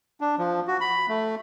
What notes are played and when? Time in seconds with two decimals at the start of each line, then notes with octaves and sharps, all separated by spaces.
0.21 D4
0.38 F3
0.68 F#4
0.81 B5
1.09 A3